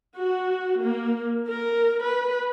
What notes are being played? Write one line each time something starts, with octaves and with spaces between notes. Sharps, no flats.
F#4
A#3
A#4
B4